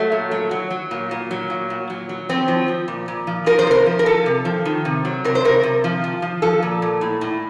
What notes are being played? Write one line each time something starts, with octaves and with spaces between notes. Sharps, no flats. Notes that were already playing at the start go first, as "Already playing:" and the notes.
Already playing: F#3 A3
A#2
F#3
F#3
F#3
A#2
A#2
F#3
A#2
A#2
F#3
F#3
F3 C4
F3
F3
A#2
A#2
F3
F3 A#4
C5
C3 A#4
F3
A#4
F3 A4
C3
F3
D#3
C3
F#3
C3 A#4
C5
C3 A#4
C3
F3
F3
F3
F3 A4
A#2
A#2
A2
A2